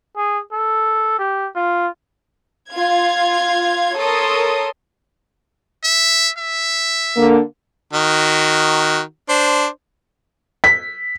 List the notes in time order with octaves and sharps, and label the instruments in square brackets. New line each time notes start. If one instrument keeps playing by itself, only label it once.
[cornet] G#4
A4
G4
F4
[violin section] F4 F5 G#6
A4 A#4 C#5 C6 D#6
[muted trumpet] E5
E5
[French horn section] D3 A#3
[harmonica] D#3 F#4
D4 C5
[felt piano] B6